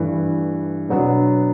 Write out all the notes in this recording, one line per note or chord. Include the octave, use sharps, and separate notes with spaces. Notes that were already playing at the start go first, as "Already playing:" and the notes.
Already playing: G2 E3 A3
B2 F#3 B3 D4